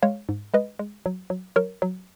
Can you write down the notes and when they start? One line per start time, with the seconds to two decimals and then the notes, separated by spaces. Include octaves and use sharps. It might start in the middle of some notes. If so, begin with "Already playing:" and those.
0.03 G#3 C#5 F5
0.29 G#2
0.54 G#3 B4 D#5
0.79 G#3
1.06 F#3
1.30 F#3
1.56 F#3 A#4 C#5
1.82 F#3